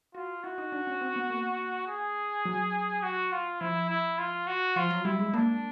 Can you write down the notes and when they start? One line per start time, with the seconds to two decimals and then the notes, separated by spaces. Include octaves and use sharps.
0.15 F4 F#4
0.43 E4 F#4
0.58 D#4
0.72 D4
0.87 C#4
1.01 C4
1.16 B3
1.30 A#3
1.88 G#4
2.45 F#3
3.03 F#4
3.32 F4
3.61 F3 E4
3.89 E4
4.18 F4
4.47 F#4
4.76 F3 F4
4.91 F#3
5.05 G3 E4
5.19 G#3
5.34 A#3 D4